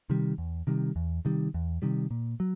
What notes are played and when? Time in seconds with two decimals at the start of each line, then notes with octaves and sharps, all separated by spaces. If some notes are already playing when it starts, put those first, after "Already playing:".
0.10 C3 D#3 G3
0.38 E2
0.67 C3 D#3 G3
0.96 E2
1.25 C3 D#3 G3
1.54 E2
1.82 C3 D#3 G3
2.11 A#2
2.40 F#3